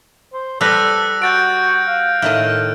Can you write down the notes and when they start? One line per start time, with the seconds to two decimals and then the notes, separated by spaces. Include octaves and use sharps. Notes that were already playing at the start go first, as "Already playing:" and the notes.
0.33 C5
0.61 G3 A4 B4 E6 F#6 A#6
1.22 F#4 G6 A6 D7
1.87 F5
2.22 A2 D#3 D#5 F6